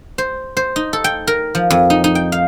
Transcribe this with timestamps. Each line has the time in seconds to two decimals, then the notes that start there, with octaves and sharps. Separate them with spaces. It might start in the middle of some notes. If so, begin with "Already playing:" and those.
0.18 C5
0.57 C5
0.76 D#4
0.93 A4
1.04 G5
1.27 A#4
1.55 F3
1.70 F2
1.90 D#4
2.04 D#4
2.15 G5
2.32 F5